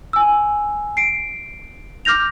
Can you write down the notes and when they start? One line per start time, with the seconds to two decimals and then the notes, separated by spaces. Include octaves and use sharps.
0.13 G#5 E6
0.97 C7 D7
2.05 D6 F6 G6 A#6 F7